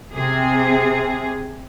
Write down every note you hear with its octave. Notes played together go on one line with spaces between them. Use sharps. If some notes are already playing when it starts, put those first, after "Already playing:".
C3 G#4